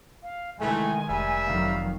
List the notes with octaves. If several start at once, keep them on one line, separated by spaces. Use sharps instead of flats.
F5
C3 D#3 E3 G#3 A3 G#5
F1 D#2 G3 A#4 E5
F2 D#3 F#3 F5